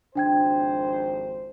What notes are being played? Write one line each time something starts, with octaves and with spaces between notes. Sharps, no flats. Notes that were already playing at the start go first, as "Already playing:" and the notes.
G#1 F2 D4 C5 G5 G#6